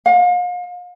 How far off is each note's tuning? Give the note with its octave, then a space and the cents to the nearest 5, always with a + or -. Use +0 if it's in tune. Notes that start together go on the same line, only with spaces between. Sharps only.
F5 +40